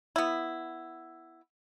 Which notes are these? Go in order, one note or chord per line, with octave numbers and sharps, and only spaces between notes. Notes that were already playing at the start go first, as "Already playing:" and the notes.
B3 E4